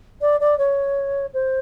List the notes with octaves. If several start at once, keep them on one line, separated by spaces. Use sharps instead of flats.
D5
D5
C#5
C5